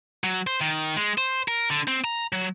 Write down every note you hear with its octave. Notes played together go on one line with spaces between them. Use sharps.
F#3
C5
D#3
G#3
C5
A#4
D3
C4
A#5
F#3